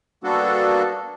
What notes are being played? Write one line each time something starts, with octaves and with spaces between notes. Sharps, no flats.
G3 A#3 B3 D4 F#4 A4